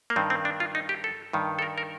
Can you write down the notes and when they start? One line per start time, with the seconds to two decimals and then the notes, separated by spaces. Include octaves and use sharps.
0.10 A#3
0.16 G2 D#3 C4
0.30 C4
0.45 D4
0.60 F4
0.75 D#4
0.89 G4
1.04 A4
1.33 G2 D#3
1.59 A4
1.62 A#4
1.78 A#4